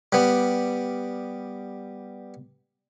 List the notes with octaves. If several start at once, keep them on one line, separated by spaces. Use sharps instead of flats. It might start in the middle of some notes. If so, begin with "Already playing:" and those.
G3 B3